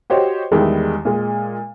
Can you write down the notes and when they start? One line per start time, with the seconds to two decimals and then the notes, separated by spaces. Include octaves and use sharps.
0.10 F#4 G4 C5 C#5 D#5
0.52 E2 D#3 G3 G#3 E4
1.05 A#2 G#3